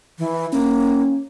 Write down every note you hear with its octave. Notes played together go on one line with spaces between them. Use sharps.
E3
A#3 C#4